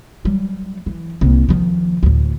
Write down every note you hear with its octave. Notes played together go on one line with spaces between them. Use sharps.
F#3 G3
E3
C2 A#3
D#3 F3
D2 A2